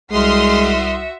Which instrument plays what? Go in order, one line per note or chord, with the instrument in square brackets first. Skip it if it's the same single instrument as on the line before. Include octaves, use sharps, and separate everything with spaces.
[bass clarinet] C2 [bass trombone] G#3 [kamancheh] F#4 E5 [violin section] C6 D#6 F6